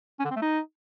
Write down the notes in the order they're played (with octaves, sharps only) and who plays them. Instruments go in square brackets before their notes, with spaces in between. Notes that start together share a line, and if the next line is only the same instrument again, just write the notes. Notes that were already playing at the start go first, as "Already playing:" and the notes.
[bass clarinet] C#4
D3
C4
A3
D#4